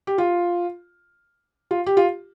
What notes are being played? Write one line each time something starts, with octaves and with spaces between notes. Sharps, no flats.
G4
F4
F4
G4
F4